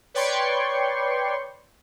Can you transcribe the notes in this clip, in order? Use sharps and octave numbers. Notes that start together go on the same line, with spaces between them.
B4 C#5 D5 G5 C6 C#6